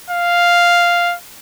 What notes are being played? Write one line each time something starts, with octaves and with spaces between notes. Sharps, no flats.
F5